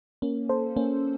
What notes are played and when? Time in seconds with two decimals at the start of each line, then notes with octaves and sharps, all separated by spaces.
0.22 A#3 C#4
0.49 A4 C5
0.76 A#3 C#4